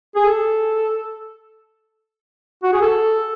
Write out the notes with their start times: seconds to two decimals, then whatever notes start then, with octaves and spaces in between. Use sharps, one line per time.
0.16 G#4
0.26 A4
2.63 F#4
2.73 G#4
2.82 A4